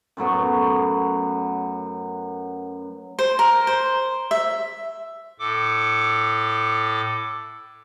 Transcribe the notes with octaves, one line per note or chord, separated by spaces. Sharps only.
F#2 A2 F#3 B3
C5
A#4
C5
E5
A2 A4 D6